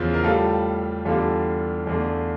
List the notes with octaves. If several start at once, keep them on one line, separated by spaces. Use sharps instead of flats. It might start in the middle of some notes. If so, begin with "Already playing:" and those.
Already playing: E2 C#3 F3 F4
A#4
A2 G3 F4 A4
E2 D3 G3 F4 A4
E2 D3 A3